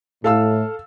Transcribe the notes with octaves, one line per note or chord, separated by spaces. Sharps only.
A2 A4 F5 E6